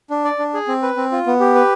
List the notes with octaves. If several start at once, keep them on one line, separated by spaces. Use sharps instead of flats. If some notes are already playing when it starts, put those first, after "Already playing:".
D4
D5
D4
G#4
C4
B4
C4
F4
B3
G4
B4